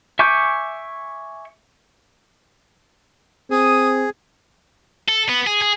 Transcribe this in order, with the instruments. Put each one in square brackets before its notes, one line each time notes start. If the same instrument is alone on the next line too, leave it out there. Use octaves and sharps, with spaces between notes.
[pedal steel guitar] E5 G#5 C#6 D6 G6
[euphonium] C4 [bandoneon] G#4 [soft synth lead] D#6
[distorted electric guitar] A4
B3
G#4
G#4